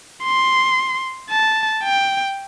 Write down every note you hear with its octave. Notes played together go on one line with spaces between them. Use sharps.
C6
A5
G5